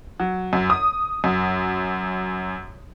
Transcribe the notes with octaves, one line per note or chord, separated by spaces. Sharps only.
F#3
F#2
D#6
F#2